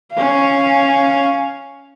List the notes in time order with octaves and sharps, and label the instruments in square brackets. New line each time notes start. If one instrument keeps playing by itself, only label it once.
[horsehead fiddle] C#4 F5